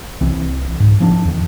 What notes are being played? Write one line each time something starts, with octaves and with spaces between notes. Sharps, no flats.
C2 E3 C4
G#2
F3 B3 D4
E2 D#3